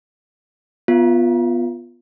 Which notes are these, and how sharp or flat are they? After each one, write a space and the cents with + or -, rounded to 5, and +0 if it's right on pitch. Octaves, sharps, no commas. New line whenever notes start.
B3 +0 F4 +0